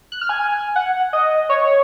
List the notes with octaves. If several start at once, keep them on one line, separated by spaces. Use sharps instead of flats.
F#6
F6
G#5
F#5
D#5
C#5